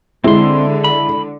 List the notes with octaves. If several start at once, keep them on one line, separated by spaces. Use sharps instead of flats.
D3 G#3 C4 E4 C6
B5